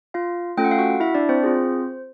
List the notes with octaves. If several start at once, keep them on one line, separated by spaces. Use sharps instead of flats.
F4 F5
A3 C#4 F4 A4 G5
F#5
F5
F#4 F#5
E4 E5
D4 D5
C4 C5
C4 F4 G#4